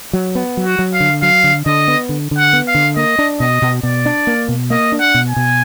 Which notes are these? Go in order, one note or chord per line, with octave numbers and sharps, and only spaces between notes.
F#3
B3
F#3
F#4
F#3
F5
D3
F#3 F5
D3
D3 D#5
B3
D3
D3
F#5
B3
F5
D3
A#3 D#5
D4
B2 D#5
B2
B2 D5
D4
A#3
B2
A#3 D#5
D4
F#5
B2
G#5
B2